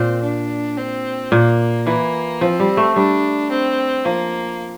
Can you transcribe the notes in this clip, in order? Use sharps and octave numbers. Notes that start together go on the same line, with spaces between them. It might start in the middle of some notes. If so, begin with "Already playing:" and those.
Already playing: A#2 C4
D4
C4
A#2 A#3
E3 A#3
F3 C4
G3
A3
G3 D4
C4
F3 A#3